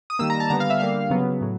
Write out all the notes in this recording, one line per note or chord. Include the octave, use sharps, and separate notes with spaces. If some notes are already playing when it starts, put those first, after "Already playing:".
D#6
D#3 G3 A#3 E6
A#5
A5
D3 G3 B3 A#5
F5
E5
D3 G3 A#3 F5
C#3 F#3 B3
A2 F#3